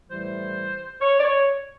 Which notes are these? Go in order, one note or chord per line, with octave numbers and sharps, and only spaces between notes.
A2 E3 G3 C5
C#5
D5
C#5